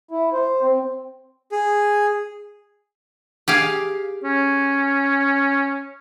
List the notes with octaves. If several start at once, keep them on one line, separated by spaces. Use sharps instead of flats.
E4
C5
C4
G#4
G4 G#4 F5
C#4